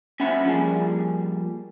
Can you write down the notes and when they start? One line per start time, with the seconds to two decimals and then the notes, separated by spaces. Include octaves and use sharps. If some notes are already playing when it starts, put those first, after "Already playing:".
0.20 C#4 E5 F#5 B5
0.45 F3 G3 A#3 G#4